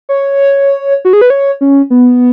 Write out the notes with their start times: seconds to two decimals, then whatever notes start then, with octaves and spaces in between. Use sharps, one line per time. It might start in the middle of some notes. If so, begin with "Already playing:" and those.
0.09 C#5
1.05 F#4
1.13 G#4
1.21 B4
1.30 C#5
1.61 C#4
1.90 B3